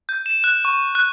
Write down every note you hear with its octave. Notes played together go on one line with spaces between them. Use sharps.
G6
E7
F#6
C#6
F#6